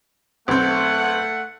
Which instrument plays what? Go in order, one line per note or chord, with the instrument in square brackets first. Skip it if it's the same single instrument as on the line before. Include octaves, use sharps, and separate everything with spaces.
[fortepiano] B1 C4 [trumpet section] A3 F#5